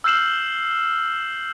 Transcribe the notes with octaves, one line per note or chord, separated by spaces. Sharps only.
E6 F6 G6 C7 E7 F#7